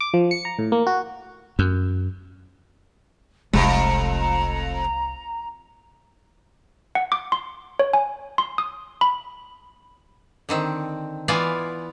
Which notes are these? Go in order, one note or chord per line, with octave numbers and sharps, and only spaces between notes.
D6
F3
C#7
A#5
A2
A#3
F#4
F#2
F1 C2 F2 C3 G#3 A#5
F#5
D6
C6
C#5
G#5
C6
D#6
B5
D3 D#3 C4
E3 B3 F4 D5 F5 G#5